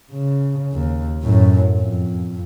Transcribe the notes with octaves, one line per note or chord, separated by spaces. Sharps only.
C#3
D#2
F#2 A2
F2